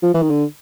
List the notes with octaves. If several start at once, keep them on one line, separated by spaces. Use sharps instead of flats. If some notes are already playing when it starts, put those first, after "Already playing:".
F3
E3
D#3
D3